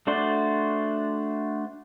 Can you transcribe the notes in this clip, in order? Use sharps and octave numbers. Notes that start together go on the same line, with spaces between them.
A3 D4 F#4 C5 D5